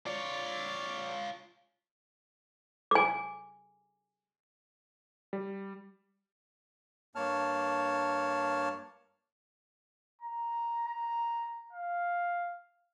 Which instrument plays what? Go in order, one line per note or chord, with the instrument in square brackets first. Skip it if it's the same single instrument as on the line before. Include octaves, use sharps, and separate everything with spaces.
[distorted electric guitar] F4 C#5 [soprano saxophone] D5
[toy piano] G#5 D6
[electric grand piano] G3
[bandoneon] G2 A#3 C#5 A5 F6
[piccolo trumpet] A#5
A#5
F5